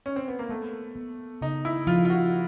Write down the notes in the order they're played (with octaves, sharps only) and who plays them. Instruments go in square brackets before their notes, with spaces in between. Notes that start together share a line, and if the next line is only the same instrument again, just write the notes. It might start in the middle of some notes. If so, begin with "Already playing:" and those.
[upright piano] C#4
C4
B3
A#3
[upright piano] A3 [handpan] B3
[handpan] B3
[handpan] C#3 [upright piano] D#4
[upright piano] E4
[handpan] F3 [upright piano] F4
[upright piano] F4
F#4